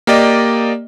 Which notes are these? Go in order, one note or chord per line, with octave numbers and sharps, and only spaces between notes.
A#3 G4 D5 D#5